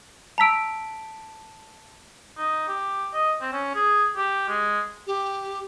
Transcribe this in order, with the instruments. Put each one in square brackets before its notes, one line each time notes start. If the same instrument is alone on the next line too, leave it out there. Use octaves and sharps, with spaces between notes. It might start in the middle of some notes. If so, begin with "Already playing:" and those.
[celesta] A5 B6 D7 [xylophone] A#5 E6
[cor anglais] D#4
G4
D#5
C4
C#4
G#4
G4
G#3
[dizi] G4